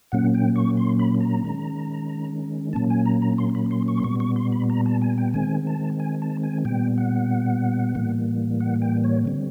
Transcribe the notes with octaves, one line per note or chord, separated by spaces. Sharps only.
A#2 F#3 A#3 C#4 F#5
G5
C#6
C6
B5
A#5
D#3 G#3 C#4
A#2 F#3 A#3 C#4 A5
G#5
A#5
A#5
C6
B5
C6
C#6
C6
A#2 G3 B3 C#6
C#6
C6
B5
A#5
A5
G#5
G5
D#3 G#3 C4 G#5
A5
G#5
A5
G#5
A#2 G3 B3 G5
F#5
A2 E3 G3 A#3
F#5
G5
C#5
D3 G3 C4